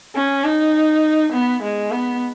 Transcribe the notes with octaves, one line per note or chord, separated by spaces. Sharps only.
C#4
D#4
B3
G#3
B3